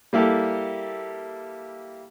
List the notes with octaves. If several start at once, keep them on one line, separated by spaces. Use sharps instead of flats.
G3 A#3 E4 G4 A4